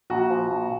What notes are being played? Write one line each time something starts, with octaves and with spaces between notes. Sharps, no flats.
A#1 F#4
F3
A#1